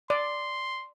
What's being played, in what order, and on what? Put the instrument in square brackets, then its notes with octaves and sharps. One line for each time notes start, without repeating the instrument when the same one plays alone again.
[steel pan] D5 [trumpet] C6